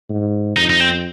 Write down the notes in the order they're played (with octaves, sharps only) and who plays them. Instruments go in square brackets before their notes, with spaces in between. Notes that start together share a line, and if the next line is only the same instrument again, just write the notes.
[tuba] G#2
[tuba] F2 [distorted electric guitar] D#4
[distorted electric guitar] D#4
C4